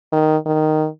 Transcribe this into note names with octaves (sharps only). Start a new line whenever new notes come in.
D#3
D#3